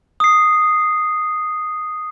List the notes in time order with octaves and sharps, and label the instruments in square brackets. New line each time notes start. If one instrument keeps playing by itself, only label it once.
[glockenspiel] D#6 C7